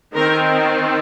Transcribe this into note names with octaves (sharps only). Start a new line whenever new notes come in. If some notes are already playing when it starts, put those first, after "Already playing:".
D#3 C4 A#4